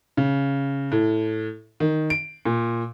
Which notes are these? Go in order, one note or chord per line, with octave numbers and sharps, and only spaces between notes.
C#3
A2
D#3
D7
A#2